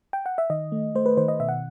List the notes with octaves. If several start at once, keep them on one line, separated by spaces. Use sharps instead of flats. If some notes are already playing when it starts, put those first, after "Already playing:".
G5
F#5
E5
D#3 D#5
A3
A3 C5
B4
D#3 C5
D#5
B2 E5
F#5